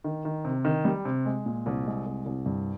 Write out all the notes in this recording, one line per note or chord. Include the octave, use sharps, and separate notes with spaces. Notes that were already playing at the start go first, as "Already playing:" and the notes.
D#3
D#3
C3
D#3
G3
C3
G#3
A#2
C2
G#3
C2
C2
G2